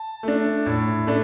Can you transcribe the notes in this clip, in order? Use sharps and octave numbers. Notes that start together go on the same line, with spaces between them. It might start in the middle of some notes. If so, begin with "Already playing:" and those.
Already playing: A5
A3 D4
A2
A3 D4